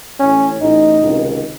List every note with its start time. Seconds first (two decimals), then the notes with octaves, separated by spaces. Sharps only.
0.20 A1 A2 C#4
0.60 A1 A2 D#4
1.01 C#2 C3 D#3